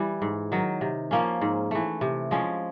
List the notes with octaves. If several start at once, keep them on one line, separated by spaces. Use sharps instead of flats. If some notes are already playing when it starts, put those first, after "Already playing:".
Already playing: E3 G3
G#2
D#3 F#3
C3
F3 A#3 C#4
G#2
E3 A3
C3
F3 G#3 C#4